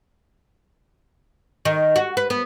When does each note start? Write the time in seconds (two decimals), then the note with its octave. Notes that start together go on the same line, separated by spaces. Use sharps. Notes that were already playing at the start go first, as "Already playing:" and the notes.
1.65 D#3
1.96 F#4
2.17 B4
2.30 B3